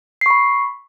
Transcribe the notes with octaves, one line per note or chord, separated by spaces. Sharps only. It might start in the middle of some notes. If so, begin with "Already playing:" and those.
B5 C#6 C7